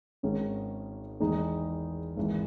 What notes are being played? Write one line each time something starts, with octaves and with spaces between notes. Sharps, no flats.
G#1 G#2 D#3 G#3 C#4
E2 D#3 G#3 D#4
G#1 G#2 E3